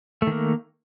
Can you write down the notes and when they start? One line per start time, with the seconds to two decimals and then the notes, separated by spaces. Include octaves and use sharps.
0.22 A3
0.27 D#3
0.32 A#3